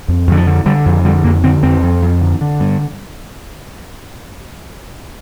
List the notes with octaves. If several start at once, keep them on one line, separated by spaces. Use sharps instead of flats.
F2
F2 D3
F3
D3
D3 G3
F2
D3 G3
F2 A#3
D3 C4
F2 C4
F2
F2
D3
D3
G2